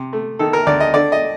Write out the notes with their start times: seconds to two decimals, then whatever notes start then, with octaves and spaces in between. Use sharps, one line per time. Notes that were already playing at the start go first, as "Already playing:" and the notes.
Already playing: C3
0.13 A3
0.39 D#3 A4
0.53 A#4
0.67 D2 D5
0.80 D#5
0.94 D3 D5
1.12 D#5